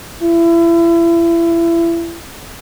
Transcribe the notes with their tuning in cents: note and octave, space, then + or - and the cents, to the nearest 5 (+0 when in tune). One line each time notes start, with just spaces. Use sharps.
E4 +30